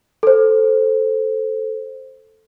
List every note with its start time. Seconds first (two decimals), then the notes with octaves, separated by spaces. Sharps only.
0.23 A4 C5